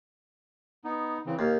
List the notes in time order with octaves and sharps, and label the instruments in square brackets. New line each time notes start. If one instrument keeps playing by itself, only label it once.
[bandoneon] B3 D#4
C#3 E3 C4
[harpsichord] D#2 [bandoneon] F5